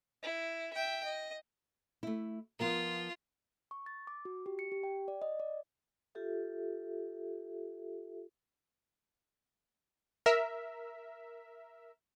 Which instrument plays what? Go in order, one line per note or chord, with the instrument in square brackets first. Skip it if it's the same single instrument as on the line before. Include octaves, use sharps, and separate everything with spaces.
[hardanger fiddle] E4
E5 G5
D#5
[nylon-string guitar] A3 E4
[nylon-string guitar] F3 B3 A#4 [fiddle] F4
[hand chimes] C#6
A6
D6
F#4
G4
C#7
G4
G5
D5
D#5
D5
[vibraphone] F4 G4 A4 E5
[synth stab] A#4 E5